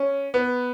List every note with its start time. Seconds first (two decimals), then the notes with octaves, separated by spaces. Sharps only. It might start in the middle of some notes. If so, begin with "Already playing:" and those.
Already playing: C#4
0.34 B3